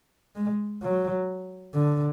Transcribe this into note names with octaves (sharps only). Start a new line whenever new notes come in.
G#3
F#3
D3